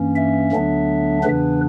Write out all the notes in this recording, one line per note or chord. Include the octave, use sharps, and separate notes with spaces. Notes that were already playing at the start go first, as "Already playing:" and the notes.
Already playing: G2 E3 A#3 C#4
E5
D2 D3 F#3 B3 D4
E2 C#3 E3 B3 D4 B4